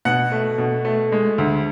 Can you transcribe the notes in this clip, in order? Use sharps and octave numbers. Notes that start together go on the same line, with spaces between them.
B2 F#5
A3
B2
A3
G#3
D2